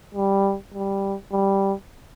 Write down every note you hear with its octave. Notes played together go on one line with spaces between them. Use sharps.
G3
G3
G3